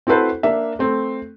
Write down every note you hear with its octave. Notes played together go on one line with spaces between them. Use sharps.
C4 E4 F#4 A4 B4 C5
A#3 D4 E5
A3 C4